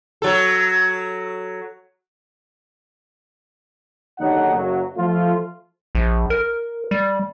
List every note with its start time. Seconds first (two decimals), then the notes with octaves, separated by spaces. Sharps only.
0.22 F#3 A4
4.19 D#2 D3 F#3 D#4 F#5
4.54 F#1 F#3
4.96 F3 A3 F4
5.95 A#1
6.30 A#4
6.91 G3